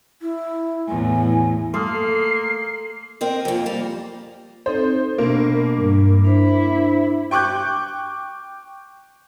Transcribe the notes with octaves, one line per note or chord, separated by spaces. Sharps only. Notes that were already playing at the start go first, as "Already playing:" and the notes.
E4
E2 A2 G#5
A3 A#3 C6 D#6 F6 C7
C4 A#4 D#5
F2 A#2
G3 A#3
C4 D#4 A4 C5
B2 A#3 D4
G2
D4 E4 C5
G5 C#6 D6 F#6 G6